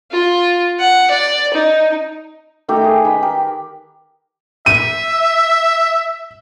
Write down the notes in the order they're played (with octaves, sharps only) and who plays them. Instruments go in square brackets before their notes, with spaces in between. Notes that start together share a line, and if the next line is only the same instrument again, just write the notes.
[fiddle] F4
F#5
D5
D#4
[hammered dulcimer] D#3 A3 G4 A#4
G#4
D#3 B4 G5 B5
G4 A#4
[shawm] E5 [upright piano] D#7